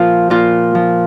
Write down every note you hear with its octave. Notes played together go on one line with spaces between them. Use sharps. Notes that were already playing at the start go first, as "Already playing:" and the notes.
Already playing: A#2 F3 F4
A#2 F4
F3